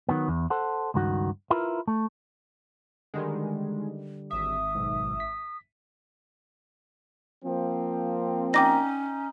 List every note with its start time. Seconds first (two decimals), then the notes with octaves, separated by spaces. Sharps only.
0.09 D#3 F#3 B3
0.28 E2
0.50 A4 C5 F#5
0.94 C#2 G2 D#3 F#4
1.50 E4 F4 A#4 B4
1.88 A3
3.14 D3 D#3 G3 G#3
4.31 G#1 E5 D#6
4.75 B1 G#2
5.20 B6
7.44 F3 A#3 C4
8.54 C#4 D#4 G5 D6 A#6